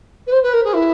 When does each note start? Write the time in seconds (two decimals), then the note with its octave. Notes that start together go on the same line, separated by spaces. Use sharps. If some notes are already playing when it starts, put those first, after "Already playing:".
0.27 B4
0.32 C5
0.43 B4
0.53 A#4
0.64 G#4
0.74 E4